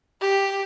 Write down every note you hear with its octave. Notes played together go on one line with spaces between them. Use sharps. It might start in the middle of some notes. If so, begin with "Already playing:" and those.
G4